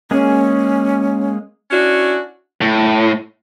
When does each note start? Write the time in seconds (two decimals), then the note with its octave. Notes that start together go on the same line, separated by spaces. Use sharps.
0.11 G#3 A#3 C#4 G#4
1.71 C#4 D4 E4 F#4
2.61 A2